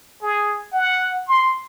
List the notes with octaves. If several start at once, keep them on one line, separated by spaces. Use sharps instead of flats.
G#4
F#5
C6